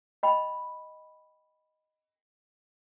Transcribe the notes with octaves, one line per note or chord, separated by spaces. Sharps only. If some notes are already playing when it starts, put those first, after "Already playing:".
D#5 G5 B5